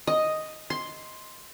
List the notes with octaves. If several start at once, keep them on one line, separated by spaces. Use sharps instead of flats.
D#5
C6